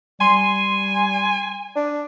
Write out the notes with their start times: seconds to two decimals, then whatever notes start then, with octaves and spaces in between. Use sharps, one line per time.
0.21 G3 G#5 C6
1.76 D4